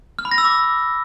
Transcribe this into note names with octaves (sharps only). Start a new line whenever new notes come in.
F6
B5
A#6
E6
D6